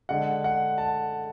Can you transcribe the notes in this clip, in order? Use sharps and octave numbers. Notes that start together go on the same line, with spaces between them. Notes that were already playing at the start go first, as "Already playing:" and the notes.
D3 G#3 F#5
F#5
A5